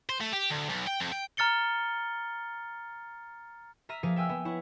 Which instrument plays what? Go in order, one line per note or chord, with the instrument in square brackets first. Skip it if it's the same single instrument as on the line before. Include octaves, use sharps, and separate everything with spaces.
[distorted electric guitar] C5
A3
G4
D2
B1
G5
F2
G5
[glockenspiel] A#5 F6 A6 C#7 G7
[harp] E5 A#5 F6 B6 D#7
F3 A#3 G#4 F5 B6
E5 G5 G#5 E6 F6
B3 E5
E4 C#5 F#5